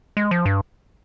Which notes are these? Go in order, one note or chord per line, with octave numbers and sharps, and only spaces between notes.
G#3
F3
G2